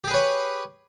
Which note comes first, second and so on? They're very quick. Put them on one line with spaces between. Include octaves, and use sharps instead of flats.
G4 G#4 B4 C#5